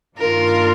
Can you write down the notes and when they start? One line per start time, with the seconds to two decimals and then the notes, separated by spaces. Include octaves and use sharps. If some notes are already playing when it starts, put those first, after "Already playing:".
0.17 G2 D#3 A#3 D4 F4 A#4